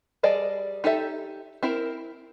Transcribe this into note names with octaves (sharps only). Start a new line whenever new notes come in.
G3 G#4 D5 D#5 A5
D#4 G4 A4 E5
C4 E4 A#4